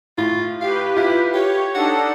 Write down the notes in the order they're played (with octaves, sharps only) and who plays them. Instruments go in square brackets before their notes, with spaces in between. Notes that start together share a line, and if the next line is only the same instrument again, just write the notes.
[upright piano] A2 [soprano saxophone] F4
[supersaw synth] G4 B4 [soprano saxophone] F5
[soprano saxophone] E4 [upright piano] F4
[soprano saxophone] G4 [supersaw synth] C#5
[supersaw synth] D4 D#4 A4 [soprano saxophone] F#5